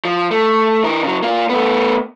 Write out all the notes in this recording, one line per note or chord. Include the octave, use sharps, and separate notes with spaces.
F3
A3
E3 A#4
C#3 F#3
A#3 F4
A3 B3